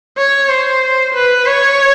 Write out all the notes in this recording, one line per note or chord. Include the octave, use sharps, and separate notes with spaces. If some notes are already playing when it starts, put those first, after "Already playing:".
C#5
C5
B4
C#5